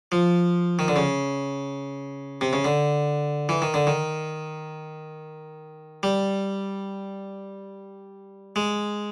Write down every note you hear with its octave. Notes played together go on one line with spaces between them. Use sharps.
F3
D#3
D3
C#3
C3
C#3
D3
E3
D#3
D3
D#3
G3
G#3